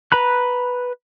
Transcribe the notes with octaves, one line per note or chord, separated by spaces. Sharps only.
B4 A#5 B5 F#6